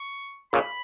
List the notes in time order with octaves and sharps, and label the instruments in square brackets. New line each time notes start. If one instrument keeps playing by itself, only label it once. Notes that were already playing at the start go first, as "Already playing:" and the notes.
Already playing: [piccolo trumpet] C#6
[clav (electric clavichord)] A#2 C#3 [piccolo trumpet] B5